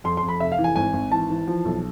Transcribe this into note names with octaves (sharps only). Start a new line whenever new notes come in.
F2 C6
F2 C6
B5
F1 E5
F5
E3
G#5
G#1 G#5
G#1
E3 A5
E3
F3
B1